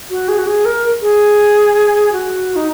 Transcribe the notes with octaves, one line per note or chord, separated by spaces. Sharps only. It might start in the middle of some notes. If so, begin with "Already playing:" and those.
F#4
G#4
F#4
G#4
A#4
G#4
F#4
D#4